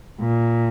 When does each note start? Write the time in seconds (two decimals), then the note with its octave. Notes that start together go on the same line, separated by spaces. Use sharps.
0.21 A#2